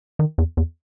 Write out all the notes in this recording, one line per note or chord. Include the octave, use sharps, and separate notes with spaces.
D#3
E2
E2